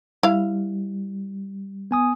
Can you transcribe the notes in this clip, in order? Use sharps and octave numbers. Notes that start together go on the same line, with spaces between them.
G3 E4 F5
B3 G#5 D#6